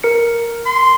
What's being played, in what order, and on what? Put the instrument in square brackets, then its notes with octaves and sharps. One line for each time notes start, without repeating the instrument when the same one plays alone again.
[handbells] A#4 C#7
[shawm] C6